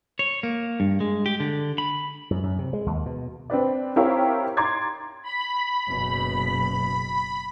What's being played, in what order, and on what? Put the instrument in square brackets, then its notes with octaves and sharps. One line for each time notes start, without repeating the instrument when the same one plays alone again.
[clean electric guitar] C#5
A#3
G2
G#3
G4
D3
B5
[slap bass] F#2
F#2
C3
G#3
D#2
B2
[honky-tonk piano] C4 D4 B4 D5
C4 E4 G4 A#4 C#5 F5
A#5 C6 D6 G#6 A6
[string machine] B5
[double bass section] F#1 B2